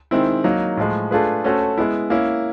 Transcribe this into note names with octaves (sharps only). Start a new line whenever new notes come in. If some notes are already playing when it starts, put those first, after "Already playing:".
D#3 G#3 C4 E4
F#3 A#3 D#4
A2 F3 G#3
A3 D4 F4 G#4 B4
A3 C#4 F#4 A4 C5
G#3 B3 E4
A#3 C#4 E4